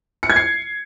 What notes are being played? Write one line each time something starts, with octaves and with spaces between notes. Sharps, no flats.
C#7
G#6
C7